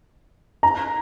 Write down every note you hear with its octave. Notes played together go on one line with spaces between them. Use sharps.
A#5